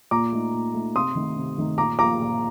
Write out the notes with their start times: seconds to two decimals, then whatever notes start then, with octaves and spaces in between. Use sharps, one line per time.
0.11 A#2 A#5 D6
0.32 A3 D#4
0.53 A#2
0.74 A3 D#4
0.95 C3 C6 D#6
1.15 D#3 A3 D#4
1.37 C3
1.58 D#3 A3 D#4
1.78 A#2 A#5 D6
1.99 F3 A#3 A#5 D6
2.20 A#2